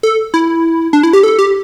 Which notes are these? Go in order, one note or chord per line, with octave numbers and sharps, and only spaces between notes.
A4
E4
D4
E4
G4
A4
G4